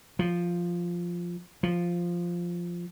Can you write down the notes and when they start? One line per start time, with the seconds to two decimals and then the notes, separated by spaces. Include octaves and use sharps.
0.19 F3
1.63 F3